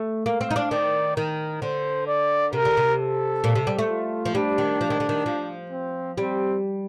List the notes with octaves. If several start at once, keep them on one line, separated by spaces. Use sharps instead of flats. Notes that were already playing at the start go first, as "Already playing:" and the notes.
Already playing: A3
A#3 F5
C4
D#4
D4
D#3 D5
D#3 A#4
D3 C5
D5
C3 A#4
D3
C3
A4
A#2
C3
G3
A3
F4
F3
G3 D4
D#3
F3
D#3
D3
D#3
F3
C4
G3 C4